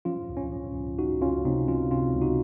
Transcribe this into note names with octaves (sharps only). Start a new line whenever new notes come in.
F3 C#4 F4
C#2
C#4
F3
C#2
C#2 D#4 F#4
C#2 C#4 F4
C3 C4 D#4
F3 C#4 F4
C3 C#4 F4
C#2
D#4 F#4